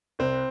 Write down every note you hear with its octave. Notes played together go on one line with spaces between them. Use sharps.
C2 C4